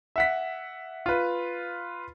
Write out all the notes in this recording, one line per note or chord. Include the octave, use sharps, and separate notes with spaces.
E5 F#5 B6
F4 B4